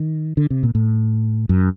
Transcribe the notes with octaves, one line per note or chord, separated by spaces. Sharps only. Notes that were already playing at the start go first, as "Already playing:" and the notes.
Already playing: D#3
D3
C3
A#2
A2
F#2